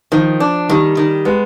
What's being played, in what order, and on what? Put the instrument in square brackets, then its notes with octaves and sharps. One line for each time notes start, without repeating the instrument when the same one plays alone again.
[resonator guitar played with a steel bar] D#3 [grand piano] F3
[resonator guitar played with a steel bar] D4
[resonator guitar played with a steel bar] D#3 [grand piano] G3
[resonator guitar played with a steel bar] D#3
[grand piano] G#3 [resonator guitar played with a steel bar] B3